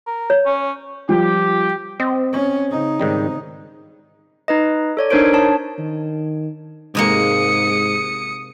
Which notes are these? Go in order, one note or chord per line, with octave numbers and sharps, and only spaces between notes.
A#4
C#5
C#4
F3 G3 F4 G4
C4 D#5
C#4
C#3 D#4
G#2 D#3 G3
D#4 B4 D#5
A4 C#5 D5
D4 D#4 A#4 C5 C#5 D7
D4 C#5 A5
D#3
G#2 C3 G#3 A#3 D#6 C#7